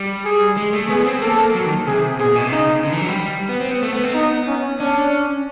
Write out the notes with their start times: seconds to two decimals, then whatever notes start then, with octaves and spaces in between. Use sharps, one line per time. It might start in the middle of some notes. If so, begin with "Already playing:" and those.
Already playing: G3
0.25 G#4
0.57 G#3
0.73 A3
0.89 B3 G#4
1.06 C4
1.22 A#3 A4
1.38 A#3
1.55 F#3
1.66 D#3
1.87 C3 G#4
2.19 B2 G#4
2.28 A#2
2.36 B2
2.44 C3
2.52 C#3 D#4
2.85 D3
2.92 E3
3.01 F#3
3.08 G3
3.49 B3
3.61 C4
3.71 B3
3.82 A3
3.93 B3
4.04 C4
4.14 B3 D#4
4.47 C#4
4.80 C#4 D4